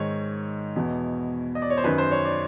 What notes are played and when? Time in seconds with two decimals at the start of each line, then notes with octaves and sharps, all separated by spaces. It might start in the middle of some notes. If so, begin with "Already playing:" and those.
Already playing: G#2 D#3 C#5
0.76 E2 B2
1.55 D#5
1.62 D5
1.70 C#5
1.77 C5
1.84 F#2 D#3 B4
1.98 C5
2.11 C#5
2.25 D5